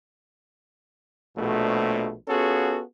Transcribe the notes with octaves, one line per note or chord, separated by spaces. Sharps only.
A#1 B2 A3
B3 C#4 F4 F#4 G#4 A4